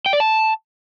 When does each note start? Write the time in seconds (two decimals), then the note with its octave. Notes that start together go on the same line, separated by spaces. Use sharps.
0.06 G5
0.13 D5
0.20 A5